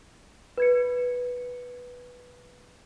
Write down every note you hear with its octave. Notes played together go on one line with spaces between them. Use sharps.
B4 G#6 C#7